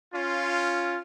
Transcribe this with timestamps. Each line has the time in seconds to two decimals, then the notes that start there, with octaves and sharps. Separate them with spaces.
0.14 C#4 F4